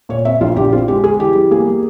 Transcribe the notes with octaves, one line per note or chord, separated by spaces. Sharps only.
A#2 C#5
C4 E5
A#1 F4
A#1 G4
C4 F4
G#3 G4
G#3 G#4
E3 G4
G3
A#3 G#4
G3